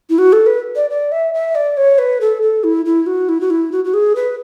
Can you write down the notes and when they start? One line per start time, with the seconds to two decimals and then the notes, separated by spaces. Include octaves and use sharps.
0.10 E4
0.18 F#4
0.33 A4
0.46 B4
0.76 D5
0.90 D5
1.12 E5
1.34 E5
1.55 D5
1.77 C#5
1.98 B4
2.21 A4
2.42 A4
2.64 E4
2.86 E4
3.06 F#4
3.29 E4
3.41 F#4
3.50 E4
3.72 F#4
3.85 F#4
3.94 G#4
4.16 B4